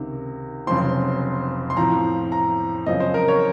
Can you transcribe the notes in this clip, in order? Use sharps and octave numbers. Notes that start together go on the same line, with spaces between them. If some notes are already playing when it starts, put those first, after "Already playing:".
Already playing: C#2 C3 D#3
F1 F2 C#3 F#3 C4 C6
C6
A2 F3 C4 A#5
A#5
F#2 C#3 F3 C4 D#5
C5
A#4
C#5